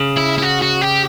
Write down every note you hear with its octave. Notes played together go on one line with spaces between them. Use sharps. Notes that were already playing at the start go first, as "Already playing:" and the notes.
Already playing: C#3
E4
E4
F#4
F#4
G4